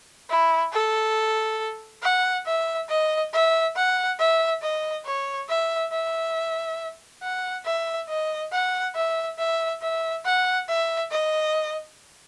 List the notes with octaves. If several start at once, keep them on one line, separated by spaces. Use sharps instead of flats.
E4
A4
F#5
E5
D#5
E5
F#5
E5
D#5
C#5
E5
E5
F#5
E5
D#5
F#5
E5
E5
E5
F#5
E5
D#5